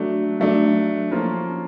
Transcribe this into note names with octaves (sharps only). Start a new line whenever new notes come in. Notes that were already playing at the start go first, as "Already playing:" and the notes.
Already playing: F#3 A3 D4
F#3 A3 D4
F3 A#3 C#4 F4